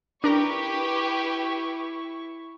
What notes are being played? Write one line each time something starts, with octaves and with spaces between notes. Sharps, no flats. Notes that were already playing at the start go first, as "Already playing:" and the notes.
D4 E4 G4 A#4 B4 A#5 C#6